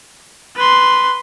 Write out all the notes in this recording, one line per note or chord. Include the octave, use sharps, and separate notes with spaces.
B4 C6